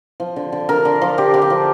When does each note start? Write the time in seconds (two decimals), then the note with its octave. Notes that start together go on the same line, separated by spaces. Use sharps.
0.20 F3
0.36 D3
0.52 D3
0.69 D3 A#4
0.85 D3
1.01 F3
1.18 D3 G4
1.34 D3
1.42 G4
1.50 F3